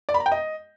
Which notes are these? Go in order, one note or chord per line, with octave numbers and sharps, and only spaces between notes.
D5
B5
A#5
G5
D#5